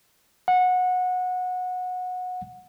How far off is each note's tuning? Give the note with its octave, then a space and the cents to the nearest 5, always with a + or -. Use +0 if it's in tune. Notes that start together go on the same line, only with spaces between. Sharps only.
F#5 -20